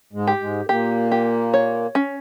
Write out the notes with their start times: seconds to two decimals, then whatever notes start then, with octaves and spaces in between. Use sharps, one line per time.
0.13 G#2 G#3
0.27 G4
0.41 G#2 G#3
0.69 A#2 A#3 G4
1.12 G4
1.54 C#5
1.95 C#4